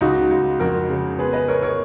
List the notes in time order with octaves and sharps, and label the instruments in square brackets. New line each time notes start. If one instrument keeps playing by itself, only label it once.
[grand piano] C#2 D#4 F#4
C#2
F2 F#4 A#4
C#3
B3 G#4 B4
B4 D#5
B3 A#4 C#5
A#4 C#5